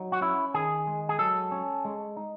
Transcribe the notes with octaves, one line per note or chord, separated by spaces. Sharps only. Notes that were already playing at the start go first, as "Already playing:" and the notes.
Already playing: F#3 D#4
F#4
C#4 E4
D#3 G#4
G#3
G#4
F#3 A4
C#4
G#3
D#4